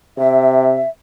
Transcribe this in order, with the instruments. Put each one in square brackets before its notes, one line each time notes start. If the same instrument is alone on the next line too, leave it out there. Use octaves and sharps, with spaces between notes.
[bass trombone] C3 [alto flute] E5